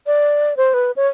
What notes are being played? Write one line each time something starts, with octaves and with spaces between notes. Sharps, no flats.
D5
C5
B4
C#5